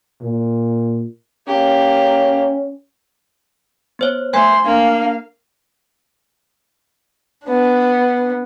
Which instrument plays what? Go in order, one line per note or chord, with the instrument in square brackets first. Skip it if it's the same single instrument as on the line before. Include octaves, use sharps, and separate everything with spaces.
[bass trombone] A#2
[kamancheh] A#3 G4 [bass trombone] C#4
[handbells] B3 C5 C#5
[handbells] A3 G#5 G#6 [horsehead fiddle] C5 E5
[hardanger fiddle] A#3 [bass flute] D4 [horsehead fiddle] F5
[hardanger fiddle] B3 D4